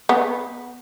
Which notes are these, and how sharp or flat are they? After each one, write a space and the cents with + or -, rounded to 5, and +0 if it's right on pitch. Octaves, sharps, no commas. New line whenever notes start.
B3 -5